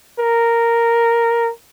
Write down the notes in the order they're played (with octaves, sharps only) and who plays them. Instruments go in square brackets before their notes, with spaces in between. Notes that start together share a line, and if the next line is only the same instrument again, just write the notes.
[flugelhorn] A#4